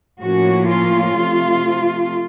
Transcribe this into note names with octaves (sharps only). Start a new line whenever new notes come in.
A2 F3 A#3 C#4 F#4
F4
C3 F3 A3